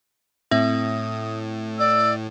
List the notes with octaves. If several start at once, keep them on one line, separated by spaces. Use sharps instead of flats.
A2 C4 E5 D#6
D5 E6